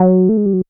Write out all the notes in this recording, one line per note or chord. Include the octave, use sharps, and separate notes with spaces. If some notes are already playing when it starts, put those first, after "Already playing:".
Already playing: F#3
A3
G#3
G3
F#3